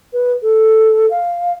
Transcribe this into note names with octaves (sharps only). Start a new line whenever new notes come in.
B4
A4
F5